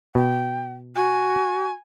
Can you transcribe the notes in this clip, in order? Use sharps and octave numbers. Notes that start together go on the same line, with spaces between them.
B2 G5
F#4 G#5